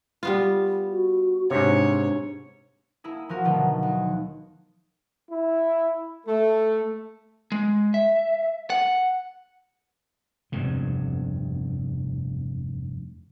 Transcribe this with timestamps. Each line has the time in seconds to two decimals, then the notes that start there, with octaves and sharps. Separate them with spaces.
0.23 G3 B3 F4
0.89 F#4
1.51 G#2 C3 D4 C#5
3.04 A#3 E4 G#4
3.29 F3 F#4 A#4
3.44 B2 D3 D#3 F3 F#3 A3
3.83 D#2
5.30 E4
6.26 A3 A4
7.52 G#3
7.94 E5
8.70 F#5
10.52 F1 E2 G2 C3